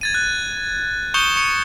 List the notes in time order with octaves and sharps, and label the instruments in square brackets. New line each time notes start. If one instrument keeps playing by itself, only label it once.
[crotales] G#6 A6 D#7
F#6
C#6 D#6 G6 C#7 E7 G7
C#6 C#7